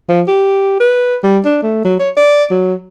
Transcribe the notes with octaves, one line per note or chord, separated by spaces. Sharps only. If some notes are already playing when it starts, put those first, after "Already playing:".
F3
G4
B4
G3
D4
A3
F#3
C#5
D5
F#3